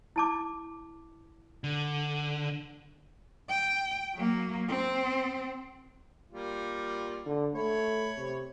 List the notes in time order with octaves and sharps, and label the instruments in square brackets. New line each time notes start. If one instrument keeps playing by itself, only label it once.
[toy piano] E4 A5 D6
[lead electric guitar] D3
[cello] G5
F#3 A#3
C4
[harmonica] G3 A#3 F4
[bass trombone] D3
[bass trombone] A3 [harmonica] C#5 B5
[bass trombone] C3